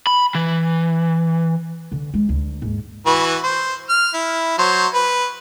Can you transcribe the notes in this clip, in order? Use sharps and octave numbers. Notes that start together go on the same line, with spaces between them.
B5
E3
D3
G#3
D2
D#2 G#2
E3 F#4 B4
C5
F6
E4
F#3 C5
B4